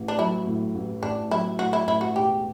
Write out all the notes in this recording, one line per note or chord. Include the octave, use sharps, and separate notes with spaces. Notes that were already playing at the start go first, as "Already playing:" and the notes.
Already playing: A1
D4
F#3 E4
A2
A1
A1 D4
F#3 E4
A2 F#4
E4
A1 E4
F#4
E1 G4